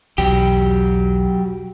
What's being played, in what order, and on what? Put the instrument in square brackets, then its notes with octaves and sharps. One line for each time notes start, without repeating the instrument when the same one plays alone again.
[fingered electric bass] B1 E2 [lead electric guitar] F#3 G4